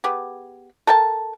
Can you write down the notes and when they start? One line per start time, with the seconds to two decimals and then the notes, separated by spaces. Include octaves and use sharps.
0.04 B3 G4 G#4
0.87 A4 A#4 G5 A5